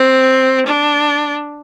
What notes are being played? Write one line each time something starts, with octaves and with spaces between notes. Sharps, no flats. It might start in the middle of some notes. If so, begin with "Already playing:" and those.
Already playing: C4
D4